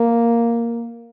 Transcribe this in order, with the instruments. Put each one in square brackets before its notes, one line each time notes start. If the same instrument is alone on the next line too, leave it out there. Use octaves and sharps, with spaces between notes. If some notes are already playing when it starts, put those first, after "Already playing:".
Already playing: [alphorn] A#3